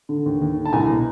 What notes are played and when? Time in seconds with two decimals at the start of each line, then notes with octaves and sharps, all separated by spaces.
0.09 D3
0.26 D#2
0.42 D#2
0.57 D3
0.65 A5
0.73 C2 G#5 A#5
0.89 B2